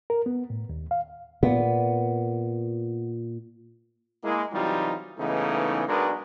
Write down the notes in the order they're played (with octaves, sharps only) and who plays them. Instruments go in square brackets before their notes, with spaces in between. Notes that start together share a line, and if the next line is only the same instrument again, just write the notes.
[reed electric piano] A#4
B3
A2
D#2
F5
[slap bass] A#2 [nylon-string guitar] B3
[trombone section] G#3 A#3 E4
C3 E3 F#3 G3 D#4 F4
G#2 C#3 E3 A3 B3 D#4
B1 G#3 D4 F#4 A#4 B4